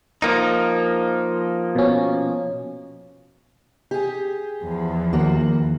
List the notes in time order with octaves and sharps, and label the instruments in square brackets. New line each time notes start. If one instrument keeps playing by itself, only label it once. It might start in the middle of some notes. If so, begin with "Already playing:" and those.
[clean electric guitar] F3 A#3 D#4
[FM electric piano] B2 C#4
[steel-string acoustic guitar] G4 G#4
[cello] E2 F3
[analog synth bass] D#2 [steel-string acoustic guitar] A#3 F#4